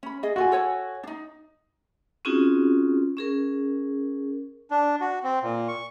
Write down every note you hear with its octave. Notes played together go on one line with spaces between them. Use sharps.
C#4 B5
G#4 D#5
F4 F#4 A4 G#5
A4 C#5 G#5
D4 D#4
C4 C#4 D#4 F4 F#4 G#4
C#4 G#4 A#4
D4
F#4
C4
A#2
C#6